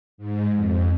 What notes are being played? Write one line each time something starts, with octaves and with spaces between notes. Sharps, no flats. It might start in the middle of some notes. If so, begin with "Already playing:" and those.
G#2
F2